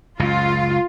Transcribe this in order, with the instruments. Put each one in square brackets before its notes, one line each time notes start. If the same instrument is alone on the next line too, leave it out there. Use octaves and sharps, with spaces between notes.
[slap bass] C#2 F#2 C#3 [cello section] F4